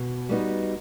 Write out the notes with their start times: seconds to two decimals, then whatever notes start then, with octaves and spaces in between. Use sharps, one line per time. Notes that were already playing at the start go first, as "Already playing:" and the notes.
Already playing: B2
0.29 G3 B3 D#4 F#4